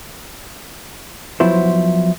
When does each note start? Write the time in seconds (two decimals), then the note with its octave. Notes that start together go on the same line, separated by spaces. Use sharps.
1.40 F3 F#3 B3 E4 C5